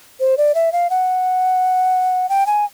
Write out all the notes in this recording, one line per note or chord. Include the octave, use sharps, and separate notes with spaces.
C5
D5
E5
F5
F#5
G5
G#5